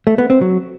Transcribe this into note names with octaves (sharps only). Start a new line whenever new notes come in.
A3
B3
C4
F#3